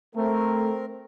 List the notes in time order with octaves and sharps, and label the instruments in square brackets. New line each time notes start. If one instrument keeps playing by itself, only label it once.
[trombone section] A3 [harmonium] C4 A#4